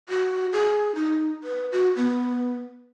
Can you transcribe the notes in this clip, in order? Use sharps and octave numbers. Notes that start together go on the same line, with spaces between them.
F#4
G#4
D#4
B4
F#4
B3